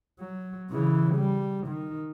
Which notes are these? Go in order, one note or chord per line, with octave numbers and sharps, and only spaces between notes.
F#3
C#3 E3
G3
D#3